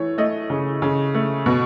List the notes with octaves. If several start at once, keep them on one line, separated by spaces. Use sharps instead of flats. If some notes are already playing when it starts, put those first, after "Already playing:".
Already playing: E3 A3 C#5
A3 D#5
C#3
C#3
A3
B2